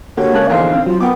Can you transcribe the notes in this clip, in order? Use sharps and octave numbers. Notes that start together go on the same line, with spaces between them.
D3 A#3 F#4 G4 C#5
C#3 G#3 A#3 A5 F#6
A#1 E2 D3 D4 D#4 C5 F5
C4
F#3 F4
B3 A#4 G5 D6